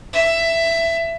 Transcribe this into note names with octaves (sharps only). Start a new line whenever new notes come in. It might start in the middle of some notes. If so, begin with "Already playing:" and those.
E5